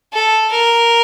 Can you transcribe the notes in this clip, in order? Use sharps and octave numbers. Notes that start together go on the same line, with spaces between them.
A4
A#4